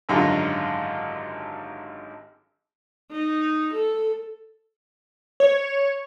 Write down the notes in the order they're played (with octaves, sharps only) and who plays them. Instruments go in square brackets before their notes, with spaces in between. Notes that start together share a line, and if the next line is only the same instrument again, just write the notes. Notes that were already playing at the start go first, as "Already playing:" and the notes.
[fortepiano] G#1 F#2 D3 G3 F4
[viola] D#4
A4
[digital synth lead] C#5